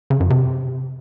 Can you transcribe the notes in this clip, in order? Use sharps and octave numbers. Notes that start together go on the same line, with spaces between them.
C#3
F#2
C3